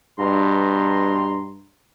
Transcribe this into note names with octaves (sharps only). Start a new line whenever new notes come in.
G2 B2 A#5 C6